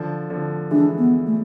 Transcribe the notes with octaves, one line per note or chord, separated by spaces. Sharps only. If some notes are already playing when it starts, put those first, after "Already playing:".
Already playing: D3 F3
D3 F3
E3 G#3 D4
B3
A3